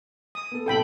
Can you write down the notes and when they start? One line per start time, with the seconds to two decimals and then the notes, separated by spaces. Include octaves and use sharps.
0.35 D#6
0.52 B3 A4
0.66 B1 A2 C3 A4 G5 B5